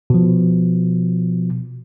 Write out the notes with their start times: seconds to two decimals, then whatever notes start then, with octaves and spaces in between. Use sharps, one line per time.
0.10 B2 F3